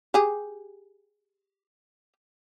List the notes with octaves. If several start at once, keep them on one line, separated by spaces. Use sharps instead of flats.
G4 G#4